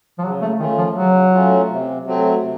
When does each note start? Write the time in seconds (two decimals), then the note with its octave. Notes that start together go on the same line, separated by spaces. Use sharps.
0.18 F3
0.24 C#3 F#3
0.42 A3
0.60 D#3 A3 C#4 F4
0.78 F3
0.96 C#3 F#3
1.33 A3 C#4 F4
1.69 C3
2.06 F#3 A3 C4
2.41 C3